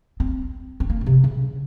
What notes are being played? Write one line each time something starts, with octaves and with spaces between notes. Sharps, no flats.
C4
C4
A#3
C#3
C3
C#3